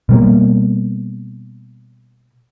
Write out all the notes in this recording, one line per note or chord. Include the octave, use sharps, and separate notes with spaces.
B2 G3 A#3